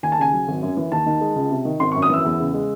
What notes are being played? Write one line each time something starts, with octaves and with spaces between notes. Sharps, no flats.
D#2 G#5
A5
C#3 G#5
F#3
G#1
F#2
E3
D#2 A5
D#3
G#3
C#2
C3
D#3
G#1 C6
C#6
F#2
D#6
E3 E6
E2
C#3
G#3